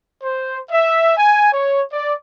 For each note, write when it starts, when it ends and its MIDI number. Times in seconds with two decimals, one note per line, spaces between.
0.23 0.59 72
0.71 1.16 76
1.17 1.53 80
1.53 1.82 73
1.92 2.15 74